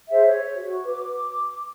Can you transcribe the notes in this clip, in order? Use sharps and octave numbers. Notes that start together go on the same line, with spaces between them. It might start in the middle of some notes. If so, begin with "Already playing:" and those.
G#4 C5 E5
C#5
F#4
B4 D6
D6